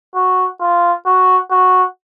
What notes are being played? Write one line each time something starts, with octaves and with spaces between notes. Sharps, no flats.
F#4
F4
F#4
F#4